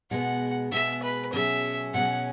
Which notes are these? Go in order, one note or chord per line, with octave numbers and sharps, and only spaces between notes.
B2 G#3 B3 G#4 F#5
B2 G#3 B3 G#4 E5
B4
B2 F#3 C#4 G#4 E5
B2 F#3 C#4 G#4 F#5